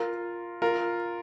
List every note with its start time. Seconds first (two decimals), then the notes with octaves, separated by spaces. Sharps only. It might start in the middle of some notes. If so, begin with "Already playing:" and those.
Already playing: F4 A#4
0.62 F4 A#4